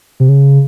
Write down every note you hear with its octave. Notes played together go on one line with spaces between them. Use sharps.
C3
C#3